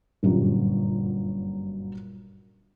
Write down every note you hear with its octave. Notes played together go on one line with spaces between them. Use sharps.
G1 F#2 A#2 F#3 G4